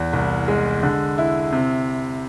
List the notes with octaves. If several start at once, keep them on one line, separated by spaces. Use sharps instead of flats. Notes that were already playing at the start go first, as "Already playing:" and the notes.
Already playing: E2
C2
G#3
D3
E4
C3